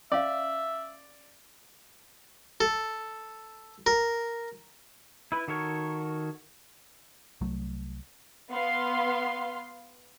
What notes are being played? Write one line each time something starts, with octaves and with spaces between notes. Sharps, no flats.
C#4 D5 E5 F5
A4
A#4
E4 B4
D#3 F#4 A4 A#4 C#5
C2 F#3 A3
B3 F5 C6